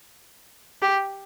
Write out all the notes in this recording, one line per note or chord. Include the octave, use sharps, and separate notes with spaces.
G4